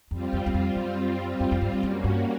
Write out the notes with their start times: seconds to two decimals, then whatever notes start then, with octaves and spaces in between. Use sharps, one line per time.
0.11 F2 G3 C4 F4
0.33 F2
0.46 E2
0.54 F2
0.75 F#2
1.40 F#2
1.51 F2
1.61 G2
1.73 G2
1.83 F#2 G3 A#3 C#4 F#4
2.04 G2